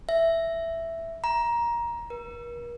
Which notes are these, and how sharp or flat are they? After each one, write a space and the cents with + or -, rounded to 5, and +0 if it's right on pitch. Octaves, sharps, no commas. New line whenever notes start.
E5 +5
A#5 +20
A#4 +45